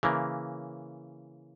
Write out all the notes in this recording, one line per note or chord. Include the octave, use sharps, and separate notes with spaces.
C#3 E3 A#3